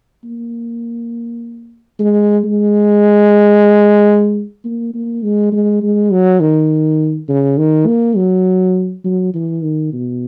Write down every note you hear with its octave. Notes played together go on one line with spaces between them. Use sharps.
A#3
G#3
G#3
A#3
A#3
G#3
G#3
G#3
F#3
D#3
C#3
D#3
A#3
F#3
F#3
E3
D#3
B2